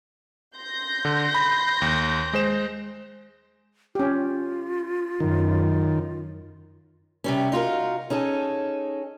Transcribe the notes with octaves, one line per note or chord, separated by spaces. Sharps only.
C6 G6 A#6
D3
B5
D#2
G#3 C5 E7
C#4 F4 G4
F#2 D#3
C3 G3 C#4
D#4 F4 F#4 A#4
C#4 D#4 G#4 A4